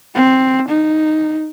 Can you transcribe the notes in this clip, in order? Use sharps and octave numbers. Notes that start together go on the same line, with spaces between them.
C4
D#4